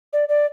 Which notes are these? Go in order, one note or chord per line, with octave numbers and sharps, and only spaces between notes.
D5
D5